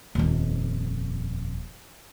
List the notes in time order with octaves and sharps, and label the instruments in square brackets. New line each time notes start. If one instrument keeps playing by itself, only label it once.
[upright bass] D#1 F2